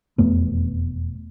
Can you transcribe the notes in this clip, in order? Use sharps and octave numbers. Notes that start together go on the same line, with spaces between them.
E1 F2 A3 B3